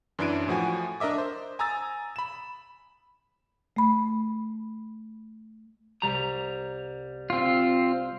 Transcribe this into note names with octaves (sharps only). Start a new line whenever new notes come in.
F#2 E3 D4 E4 D7 D#7
A2 F3 F#4 G#5
D4 A#4 D#5 E5 D6
C5
G#5 A#5 D#6 E6 A6
B5 E7
A3 B5
C2 G3 A#5
C4 F4